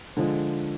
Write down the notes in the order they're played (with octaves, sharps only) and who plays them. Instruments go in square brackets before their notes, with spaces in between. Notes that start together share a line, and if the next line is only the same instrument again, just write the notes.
[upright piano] D3 F3 G#3